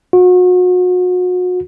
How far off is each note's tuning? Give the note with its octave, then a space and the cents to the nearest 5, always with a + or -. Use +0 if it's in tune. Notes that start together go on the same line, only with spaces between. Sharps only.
F#4 -35